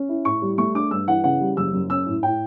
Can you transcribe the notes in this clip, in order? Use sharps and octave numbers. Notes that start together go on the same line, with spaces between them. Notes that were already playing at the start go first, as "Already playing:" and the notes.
Already playing: C#4
E4
A2 C#6
G3
A3 C#6
D4 D6
G2 E6
E3 F#5
C#3 F#5
G3
F#1 E6
F#2
C#4 E6
A2
A2 G5